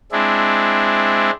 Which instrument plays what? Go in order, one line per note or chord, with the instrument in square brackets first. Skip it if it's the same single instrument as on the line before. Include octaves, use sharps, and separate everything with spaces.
[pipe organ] G#3 C4 D4 E4